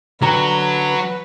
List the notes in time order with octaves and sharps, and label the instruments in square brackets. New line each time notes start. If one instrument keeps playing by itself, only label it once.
[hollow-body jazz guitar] D3 A#5 [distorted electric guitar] F#3 [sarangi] B4